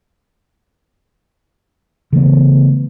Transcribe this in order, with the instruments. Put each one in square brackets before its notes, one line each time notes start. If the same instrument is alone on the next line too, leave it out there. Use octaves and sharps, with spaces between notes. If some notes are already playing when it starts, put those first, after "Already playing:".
[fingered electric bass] C#3 E3 A3 B3